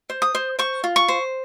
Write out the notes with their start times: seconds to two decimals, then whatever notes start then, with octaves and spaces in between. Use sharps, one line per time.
0.10 C5
0.22 D#6
0.35 C5
0.59 C5 C#6
0.84 F4
0.96 C#6
1.08 C5